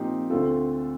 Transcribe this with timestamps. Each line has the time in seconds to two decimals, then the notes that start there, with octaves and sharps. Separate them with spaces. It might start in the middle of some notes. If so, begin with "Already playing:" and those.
Already playing: A#2 F3 C4 D#4 G4
0.30 D2 D3 A3 C4 F4 A4